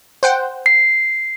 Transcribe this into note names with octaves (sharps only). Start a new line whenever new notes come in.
C5 F#5 G5
C7